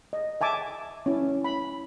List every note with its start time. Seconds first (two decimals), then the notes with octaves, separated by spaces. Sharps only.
0.13 D#5
0.41 E5 G#5 A5 D6
1.06 C#4 E4
1.44 B5